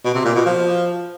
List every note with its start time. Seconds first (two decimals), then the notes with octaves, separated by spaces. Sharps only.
0.04 B2
0.15 C3
0.25 A#2
0.35 B2
0.46 F3